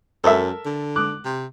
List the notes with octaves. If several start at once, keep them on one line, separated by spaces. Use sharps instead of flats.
F#2 A4 A#4 E5
D3
D6 F#6
C3